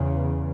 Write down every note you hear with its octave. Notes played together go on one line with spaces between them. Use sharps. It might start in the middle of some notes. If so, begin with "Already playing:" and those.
Already playing: E2 C#3